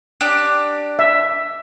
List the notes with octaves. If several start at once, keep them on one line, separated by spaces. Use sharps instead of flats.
D4 G4
E5